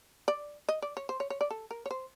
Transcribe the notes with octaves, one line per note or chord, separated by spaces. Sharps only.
D5
D#5
D5
C#5
C5
C#5
C#5
D5
A4
A#4
C#5
C5